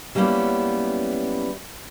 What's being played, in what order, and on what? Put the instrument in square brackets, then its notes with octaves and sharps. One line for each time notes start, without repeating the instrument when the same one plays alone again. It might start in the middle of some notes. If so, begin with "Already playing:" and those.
[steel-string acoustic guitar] F#3 G3 A#3 B3 C#4 E4